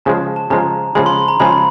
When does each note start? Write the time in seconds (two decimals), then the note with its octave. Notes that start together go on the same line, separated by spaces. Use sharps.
0.06 C#3 F3 G#3 A5
0.36 A5
0.50 C#3 F3 G#3 A#5
0.95 C#3 F3 G#3 B5
1.06 C6
1.28 A#5
1.40 C#3 F3 G#3 B5